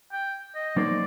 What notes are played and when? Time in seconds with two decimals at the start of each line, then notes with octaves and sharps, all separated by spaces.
0.12 G5
0.55 D#5
0.76 F#3 A#3 D#4 A4 C5 D5